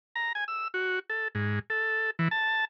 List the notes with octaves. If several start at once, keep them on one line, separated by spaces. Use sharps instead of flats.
A#5
G#5
E6
F#4
A4
G#2
A4
E3
A5